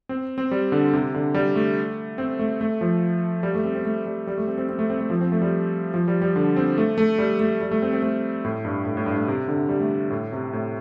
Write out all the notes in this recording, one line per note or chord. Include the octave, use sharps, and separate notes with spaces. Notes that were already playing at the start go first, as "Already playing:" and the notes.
C4
C4
G3
D3
C3
D3
G3
A3
C4
A3
A3
F3
G3
A3
C4
C4
A3
G3
G3
A3
C4
C4
C4
A3
C4
A3
F3
C4
A3
G3
F3
G3
G3
D3
C4
A3
A3
G3
A3
G3
A3
C4
C4
A3
A2
G2
A2
A2
G2
A2
C3
D3
G3
A3
A2
C3
A2